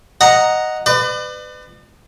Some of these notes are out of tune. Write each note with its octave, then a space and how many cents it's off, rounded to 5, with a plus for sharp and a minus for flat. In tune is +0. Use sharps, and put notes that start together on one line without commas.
D#5 +0 F#5 +0 A#5 +0
B4 +30 D5 +40